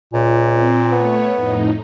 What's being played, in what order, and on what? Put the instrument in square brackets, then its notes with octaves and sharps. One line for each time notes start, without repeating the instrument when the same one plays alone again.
[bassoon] C#2 [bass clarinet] A#2
[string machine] C4
[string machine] A3 C#5 [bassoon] B3
[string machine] F2 A2 D#4